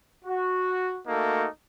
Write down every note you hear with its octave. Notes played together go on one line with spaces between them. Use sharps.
F#4
A3 A#3 D#4 F#4 A4